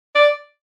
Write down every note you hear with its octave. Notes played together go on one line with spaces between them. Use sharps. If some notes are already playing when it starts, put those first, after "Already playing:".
D5